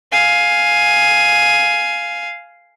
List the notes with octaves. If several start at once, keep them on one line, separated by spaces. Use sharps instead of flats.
F5 G#5